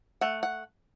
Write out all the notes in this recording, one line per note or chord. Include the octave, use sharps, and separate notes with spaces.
A3 F#5
F#5